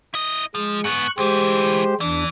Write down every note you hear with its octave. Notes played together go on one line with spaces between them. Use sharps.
E4 D#5
F3 G#3
G#2 B3 C#6 F#6
D2 E3 G#3 G4 C5
E2 E3 D4